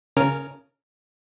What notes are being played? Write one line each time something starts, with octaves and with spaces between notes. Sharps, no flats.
C#3 C#4 A#4